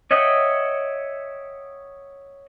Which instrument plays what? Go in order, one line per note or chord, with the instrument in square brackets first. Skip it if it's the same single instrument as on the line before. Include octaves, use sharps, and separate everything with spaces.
[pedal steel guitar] C#5 D#5 E5 F#5 G5